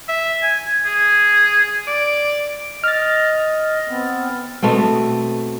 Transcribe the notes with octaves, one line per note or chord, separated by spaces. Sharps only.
E5
G#5
G#4
D5
D#5 F6 A6
B3 C4
B2 A3 B3 C4